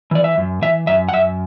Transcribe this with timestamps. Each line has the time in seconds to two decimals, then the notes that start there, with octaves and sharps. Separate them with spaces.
0.11 E3 D5
0.24 E5
0.38 F#2
0.62 E3 E5
0.87 F#2 E5
1.09 F#5
1.13 F#2 E5